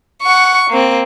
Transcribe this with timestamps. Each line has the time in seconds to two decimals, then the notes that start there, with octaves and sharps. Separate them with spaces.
0.23 F#5 C#6
0.70 A#3 C4